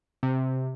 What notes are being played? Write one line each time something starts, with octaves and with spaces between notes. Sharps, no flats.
C3